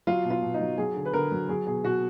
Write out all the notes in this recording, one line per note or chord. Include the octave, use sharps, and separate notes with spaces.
F#3 F4
B2
F4
B2
D#4
F#3
F#3 G#4
D3
B4
D3 A#4
F#3
F#3 G#4
B2 G#4
B2 F#4